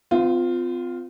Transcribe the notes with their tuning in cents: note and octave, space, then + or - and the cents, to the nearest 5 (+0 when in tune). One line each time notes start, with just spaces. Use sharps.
C4 -40 F4 +5